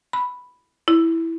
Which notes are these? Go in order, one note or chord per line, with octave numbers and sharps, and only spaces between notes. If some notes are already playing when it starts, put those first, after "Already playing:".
B5
E4